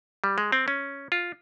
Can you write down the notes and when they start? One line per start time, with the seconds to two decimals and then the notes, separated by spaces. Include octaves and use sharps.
0.24 G3
0.38 G#3
0.52 C4
0.68 C#4
1.12 F4